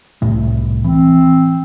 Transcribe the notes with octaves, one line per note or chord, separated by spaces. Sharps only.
C2 A2 A3
E3 C4